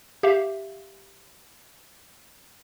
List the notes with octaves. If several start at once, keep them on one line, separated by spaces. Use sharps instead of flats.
G4 E5 F5